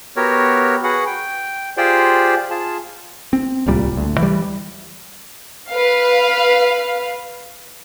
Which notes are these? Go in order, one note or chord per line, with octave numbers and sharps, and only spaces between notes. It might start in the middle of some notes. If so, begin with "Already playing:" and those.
B3 F#4 G4 A#4 C#5
F#4 G#4 B4 F#5
G5
F4 G4 G#4 C5 D5 G5
F4 G#4 A5
C4
D1 C2 A#2 G3
D2
E3 G3
B4 F5